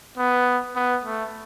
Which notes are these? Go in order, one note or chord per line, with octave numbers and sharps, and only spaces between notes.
B3
B3
A3